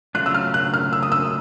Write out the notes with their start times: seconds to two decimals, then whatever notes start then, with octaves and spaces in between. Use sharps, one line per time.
0.15 C#3 F#3 A3 D4 F4 F#6
0.26 E6
0.34 F6
0.54 F#6
0.74 F6
0.93 E6
1.03 D#6
1.12 E6